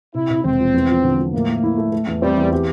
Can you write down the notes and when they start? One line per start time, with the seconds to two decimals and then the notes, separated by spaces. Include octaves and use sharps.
0.14 C3 E4
0.30 C3
0.44 E1 C4
0.59 F3
0.74 E2
0.89 F3
1.04 D3
1.19 F3
1.33 A2 A#3
1.49 A2
1.64 E4
1.77 A3
1.92 A3
2.07 E2
2.22 G3 C4
2.37 E2
2.52 G4